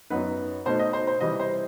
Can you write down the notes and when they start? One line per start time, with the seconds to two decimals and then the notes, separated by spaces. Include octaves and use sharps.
0.10 F#2 F#3 B3 D#4 B4
0.66 B2 A3 D#4 C5
0.79 D#5
0.93 C5
1.07 C5
1.20 C3 E3 G3 D#5
1.40 C5